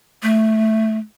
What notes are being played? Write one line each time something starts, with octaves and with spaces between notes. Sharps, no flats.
A3